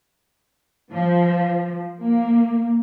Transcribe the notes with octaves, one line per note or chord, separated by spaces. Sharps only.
F3
A#3